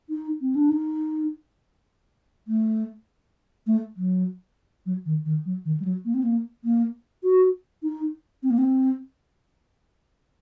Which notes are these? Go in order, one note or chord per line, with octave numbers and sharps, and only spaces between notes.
D#4
C4
D4
D#4
A3
A3
F#3
F#3
D#3
D#3
F#3
D#3
G3
F#3
A#3
C4
A#3
A#3
F#4
D#4
C4
A#3
C4